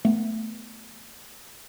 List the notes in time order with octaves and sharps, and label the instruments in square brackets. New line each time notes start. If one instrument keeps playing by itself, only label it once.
[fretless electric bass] A3 B3